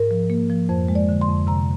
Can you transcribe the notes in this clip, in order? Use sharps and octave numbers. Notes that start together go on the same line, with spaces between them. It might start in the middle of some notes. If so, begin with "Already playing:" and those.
Already playing: G#2 A#4
F3
A#3
F3
F2 C5
G#3
D5
D3
C6
F2
C3 A#5